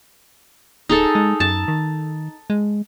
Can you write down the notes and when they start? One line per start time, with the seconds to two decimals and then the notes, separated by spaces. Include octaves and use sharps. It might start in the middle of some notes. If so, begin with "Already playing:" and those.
0.89 D1 D#4 G#4 A4
1.15 G#3
1.40 F#2 A5
1.68 D#3
2.50 G#3